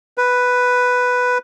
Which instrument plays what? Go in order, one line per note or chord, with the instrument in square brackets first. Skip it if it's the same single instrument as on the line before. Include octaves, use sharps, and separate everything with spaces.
[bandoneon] B4